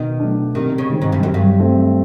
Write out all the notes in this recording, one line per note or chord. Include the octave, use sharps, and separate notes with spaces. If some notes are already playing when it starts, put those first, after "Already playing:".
Already playing: B2 D#3
F#3 A3 D4
C3 D#3
C#3
D#3 G#3 C4
G#2
G2
F#2 F#3
G2
A3 C4